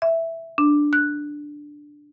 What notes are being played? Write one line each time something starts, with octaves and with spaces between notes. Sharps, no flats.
E5
D4
F#6